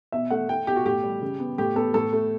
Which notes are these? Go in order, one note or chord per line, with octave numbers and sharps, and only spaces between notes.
B2 E5
A3 F#5
A3 G5
B2 G4
F#4
A2 G4
G3
C#3
B3
A2 G4
B3 A4
A2 A4
A3